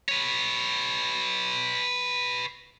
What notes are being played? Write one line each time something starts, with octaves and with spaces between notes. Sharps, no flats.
B4 C#5